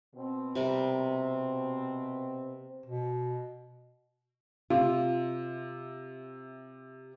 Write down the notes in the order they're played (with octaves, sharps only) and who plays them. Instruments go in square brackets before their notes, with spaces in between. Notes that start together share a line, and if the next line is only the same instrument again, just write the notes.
[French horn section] B2 C4
[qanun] C3 G3 A#4
[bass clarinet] B2
[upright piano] C3 [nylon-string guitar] F4